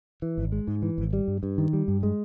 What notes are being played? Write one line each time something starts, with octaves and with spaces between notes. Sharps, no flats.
E3
G#1
G#3
G#2
E3
G#1
G3
G2
G2
D#3
G3
G2
G#3